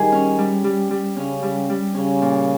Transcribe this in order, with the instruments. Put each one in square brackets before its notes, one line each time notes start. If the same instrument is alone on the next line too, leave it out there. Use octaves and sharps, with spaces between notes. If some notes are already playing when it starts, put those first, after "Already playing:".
Already playing: [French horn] D#3 [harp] G3 G#4
[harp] C#4
G3
G3
G3
[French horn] C#3 [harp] C#4
[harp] G3
G3
[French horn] C#3 [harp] C#4
[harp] A#2